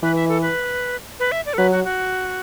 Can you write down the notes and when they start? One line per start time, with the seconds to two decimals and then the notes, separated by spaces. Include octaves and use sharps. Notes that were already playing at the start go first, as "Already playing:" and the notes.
0.03 E3 B4
0.16 E5
0.29 A4
0.42 B4
1.19 B4
1.32 E5
1.46 D5
1.54 A4
1.58 F#3 B4
1.71 F#4
1.84 F#4